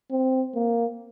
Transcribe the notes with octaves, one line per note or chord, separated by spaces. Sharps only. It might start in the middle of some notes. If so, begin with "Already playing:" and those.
C4
A#3